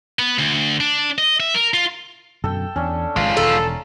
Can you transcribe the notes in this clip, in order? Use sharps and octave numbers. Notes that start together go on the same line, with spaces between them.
B3
D2
D4
D#5
E5
A#4
F4
F#2 B2 D3 A4 G5
E2 C#4 D4
G#1 F3 G#3 F4
E1 D#3 A4 A#5